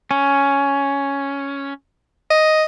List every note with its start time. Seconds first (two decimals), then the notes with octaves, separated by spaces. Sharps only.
0.11 C#4
2.30 D#5